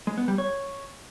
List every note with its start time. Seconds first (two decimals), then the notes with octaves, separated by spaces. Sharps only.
0.07 G#3
0.18 B3
0.28 G3
0.38 C#5